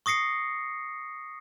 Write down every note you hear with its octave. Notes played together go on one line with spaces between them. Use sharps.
C#6 D#6 A#6 C7 C#7